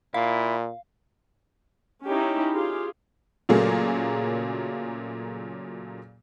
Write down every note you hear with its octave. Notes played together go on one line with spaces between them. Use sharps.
A#2 E4 F5
C#4 D#4 E4 G4
F4 G4 G#4
A#2 C#3 F#3 A3 A#3 G#4